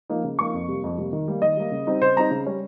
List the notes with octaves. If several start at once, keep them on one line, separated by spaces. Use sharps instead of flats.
F3 A#3 D#4
C#3
F3 A#3 D#4 C#6
F2
C3 G3 A#3
F2
C3 G3 A#3
D#3
G3 A#3
D#3 D#5
G3 A#3
C#3
G3 C4 D#4
C#3 C5
G3 C4 D#4 A#5
C#3
G3 C#4